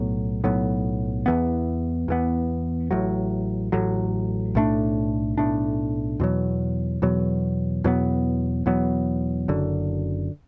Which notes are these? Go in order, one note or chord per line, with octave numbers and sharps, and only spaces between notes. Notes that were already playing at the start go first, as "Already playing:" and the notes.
Already playing: B1 A2 F#3 B3
B1 A2 F#3 B3
E2 E3 B3
E2 E3 B3
A1 A2 F#3
A1 A2 F#3
B1 A2 A3 D4
B1 A2 A3 D4
E2 B2 F#3
E2 B2 F#3
E2 B2 F#3 B3
E2 B2 F#3 B3
F#1 F#2 D3